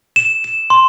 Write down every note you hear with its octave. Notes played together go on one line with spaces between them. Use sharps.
E7
E7
C6